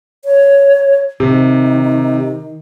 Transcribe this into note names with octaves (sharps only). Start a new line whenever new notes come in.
C#5
C3 D#3